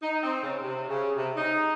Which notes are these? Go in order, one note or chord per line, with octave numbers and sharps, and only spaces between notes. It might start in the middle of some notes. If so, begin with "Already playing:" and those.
D#4
C4
C#3
C3
C#3
C3
D#4